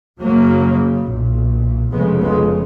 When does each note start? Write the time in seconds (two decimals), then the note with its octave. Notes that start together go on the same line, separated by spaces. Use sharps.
0.21 F#1 F#2 C#3 F#3 A#3
1.07 B1 A#2
1.93 F1 F2 C#3 G#3 B3
2.21 G#3 B3